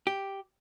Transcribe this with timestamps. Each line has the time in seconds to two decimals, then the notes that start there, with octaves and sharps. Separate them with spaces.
0.07 G4